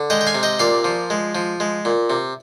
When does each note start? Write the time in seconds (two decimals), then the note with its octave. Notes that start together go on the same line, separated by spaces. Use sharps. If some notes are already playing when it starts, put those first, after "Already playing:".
Already playing: D3
0.10 G#3 D#5 G5
0.21 G5
0.27 F5 G#5
0.35 C3
0.43 D#5 G5
0.59 A#2 D5 F5
0.84 F3
1.10 G#3
1.35 F3
1.60 G#3
1.85 A#2
2.10 C3